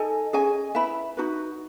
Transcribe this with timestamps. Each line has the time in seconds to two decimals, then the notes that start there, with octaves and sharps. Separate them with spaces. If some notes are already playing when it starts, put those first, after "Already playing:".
Already playing: D#4 A4 D#5 G#5
0.33 C#4 G#4 D#5 G#5
0.75 E4 B4 E5 B5
1.17 D#4 F#4 B4